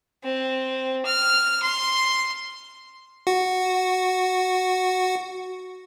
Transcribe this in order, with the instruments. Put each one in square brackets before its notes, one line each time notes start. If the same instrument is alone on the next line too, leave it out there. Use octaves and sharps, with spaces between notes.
[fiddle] C4
F6
C6
[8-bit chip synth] F#4 F#5